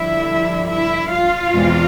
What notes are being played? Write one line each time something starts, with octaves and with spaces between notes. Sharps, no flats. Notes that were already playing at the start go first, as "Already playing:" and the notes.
Already playing: G2 D3 F3 E4 E5
E4 E5
F4 F5
E2 B2 G#3 C4